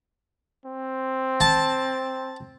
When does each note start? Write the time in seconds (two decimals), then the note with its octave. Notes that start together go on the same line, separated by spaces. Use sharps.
0.65 C4
1.41 A5